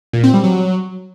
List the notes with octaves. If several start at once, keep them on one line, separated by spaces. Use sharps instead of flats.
A#2
C4
G3
F#3